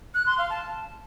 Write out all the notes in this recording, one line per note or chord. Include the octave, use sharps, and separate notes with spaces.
F#6
C6
F5
A5